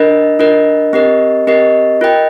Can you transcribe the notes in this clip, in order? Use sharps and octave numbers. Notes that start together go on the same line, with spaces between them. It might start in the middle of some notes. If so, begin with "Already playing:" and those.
Already playing: D4 F4 A#4 D#5
D4 F4 A#4 D#5
C4 G4 A#4 D#5
C4 G4 A#4 D#5
F4 A#4 D#5 G5